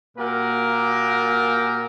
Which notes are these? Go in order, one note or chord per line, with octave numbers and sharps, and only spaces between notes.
A#2 A#3 F#4 G4 A#4